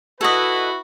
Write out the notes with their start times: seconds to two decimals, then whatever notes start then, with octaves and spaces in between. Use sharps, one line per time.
0.21 E4 F#4 A4 B4 D#5